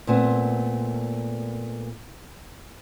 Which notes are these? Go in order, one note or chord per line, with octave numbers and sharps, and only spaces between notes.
A#2 A3 B3 C4